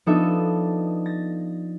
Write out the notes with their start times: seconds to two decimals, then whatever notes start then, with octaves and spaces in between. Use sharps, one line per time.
0.06 F3 B3 D4 D#4 A4 E5
1.06 A6 A#6